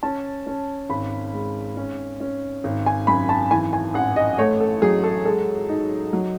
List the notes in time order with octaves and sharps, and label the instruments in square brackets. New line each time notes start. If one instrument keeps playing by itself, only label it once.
[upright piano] C#4 A5
C#4
G#1 B5
G#3
C#4
C#4
G#1
G#5
F#2 B5
A5
E3 G#5
G#5
A1 F#5
D#5
A3 C#5
A4
F#3 G#4
A4
G#3 A4
D#4
F#3